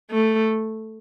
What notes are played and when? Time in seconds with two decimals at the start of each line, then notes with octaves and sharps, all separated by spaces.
0.11 A3